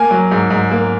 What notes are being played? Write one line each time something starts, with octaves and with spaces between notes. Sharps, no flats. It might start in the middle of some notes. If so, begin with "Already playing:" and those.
Already playing: A#3 G#5
F#3
G#2
G#2
A#3